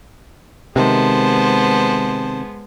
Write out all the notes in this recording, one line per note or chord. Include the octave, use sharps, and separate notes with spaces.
C3 D#3 G#3 B3 G#4 C5 A5